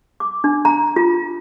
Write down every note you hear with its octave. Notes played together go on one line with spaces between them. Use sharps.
D6
D4
A#5
F4